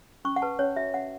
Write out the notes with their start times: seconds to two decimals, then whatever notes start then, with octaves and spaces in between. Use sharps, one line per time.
0.25 C#4 C#6
0.36 F#5
0.42 B4 A5
0.59 C#4 C#5
0.76 F#4 E5
0.93 C#4 F#5